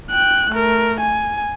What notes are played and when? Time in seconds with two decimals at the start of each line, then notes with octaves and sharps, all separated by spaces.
0.11 G5 F#6
0.50 A3 A#4
1.00 G#5